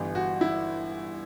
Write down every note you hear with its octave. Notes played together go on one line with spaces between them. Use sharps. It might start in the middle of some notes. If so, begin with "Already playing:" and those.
Already playing: G1 G2 E3
F#4
E4